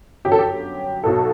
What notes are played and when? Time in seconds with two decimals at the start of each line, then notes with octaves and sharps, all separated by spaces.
0.25 G1 F#2 F#3 G4
0.32 A4
0.39 G4
1.04 B1 B2 F#3 A4